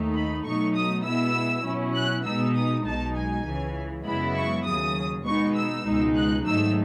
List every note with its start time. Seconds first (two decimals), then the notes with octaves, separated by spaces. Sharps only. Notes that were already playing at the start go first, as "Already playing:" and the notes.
Already playing: D#2 D#3 A3 D#4
0.14 B5
0.45 B2 F#3 A3 D#4 C#6
0.75 D#6
1.04 B2 G#3 B3 E4 E6
1.64 B2 F#3 C#4 E4
1.94 F#6
2.24 B2 G#3 B3 D#4 E6
2.55 D#6
2.84 B1 B2 G#3 D#4 A5
3.15 G#5
3.45 C#2 C#3 E3
4.05 F#2 C#3 G#3 B3 E4 B5
4.35 C#6
4.65 D#2 C#3 F#3 D#6
5.25 B2 G#3 B3 D#4 C#6
5.55 E6
5.85 C#2 B2 G#3 D#4
6.15 F#6
6.45 G#2 D#3 F#3 A3 D#4 E6